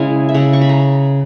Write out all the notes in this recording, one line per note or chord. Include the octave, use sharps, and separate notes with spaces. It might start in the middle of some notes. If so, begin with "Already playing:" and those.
Already playing: C#3 G#3 C#4 E4 G#5
E5
C#3 F#5
C#6
B5
A#5